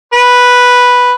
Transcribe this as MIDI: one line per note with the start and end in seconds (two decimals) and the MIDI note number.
0.13 1.13 71